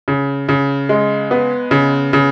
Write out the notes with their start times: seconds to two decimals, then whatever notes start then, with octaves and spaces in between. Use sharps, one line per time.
0.08 C#3
0.49 C#3
0.89 G#3
1.31 B3
1.71 C#3
2.13 C#3